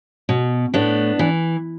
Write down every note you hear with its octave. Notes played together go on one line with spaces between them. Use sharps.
B2
A2 B3 D4
E3